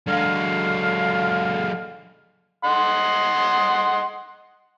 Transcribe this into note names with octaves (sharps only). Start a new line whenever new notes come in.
D3 F#3 G#3 F5
D#5 F#5 C6